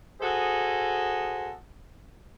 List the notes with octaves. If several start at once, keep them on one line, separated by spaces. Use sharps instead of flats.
F#4 G#4 A4 C5 D#5